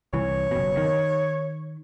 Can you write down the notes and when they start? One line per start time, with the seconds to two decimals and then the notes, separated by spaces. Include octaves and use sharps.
0.13 C2 E3 C#5
0.51 F#1 B2
0.77 D#3